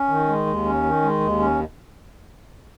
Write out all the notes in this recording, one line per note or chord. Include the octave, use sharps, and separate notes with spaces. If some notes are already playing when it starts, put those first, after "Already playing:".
Already playing: C#4
D#3
G#3
D#2
C#4
D#3
G#3
D#2
C#4